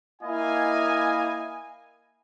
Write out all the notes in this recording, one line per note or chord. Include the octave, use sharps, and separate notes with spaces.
A#3 E4 D#5 F5 G#5